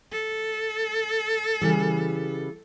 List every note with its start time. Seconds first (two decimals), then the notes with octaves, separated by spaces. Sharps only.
0.12 A4
1.61 C#3 E3 G3